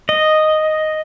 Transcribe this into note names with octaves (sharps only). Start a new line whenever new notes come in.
D#5